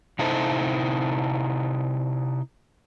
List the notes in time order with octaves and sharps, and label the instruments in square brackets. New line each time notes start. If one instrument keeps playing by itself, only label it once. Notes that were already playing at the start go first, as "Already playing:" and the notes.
[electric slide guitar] C3 D#4 E4 A4 C5